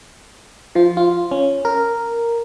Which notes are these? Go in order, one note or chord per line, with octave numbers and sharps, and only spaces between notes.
F3 F4
F4
C#4
A#4